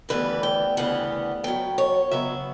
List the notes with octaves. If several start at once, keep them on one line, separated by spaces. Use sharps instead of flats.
D2 C#3 E3 G3 B3 B4
G5
D2 C#3 E3 G3 B3 F#5
C#3 F#3 B3 G5
C#5
C#3 F#3 B3 E5